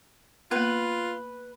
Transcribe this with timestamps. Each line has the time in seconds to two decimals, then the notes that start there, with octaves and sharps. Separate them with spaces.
0.51 A#3 B3 F4 B4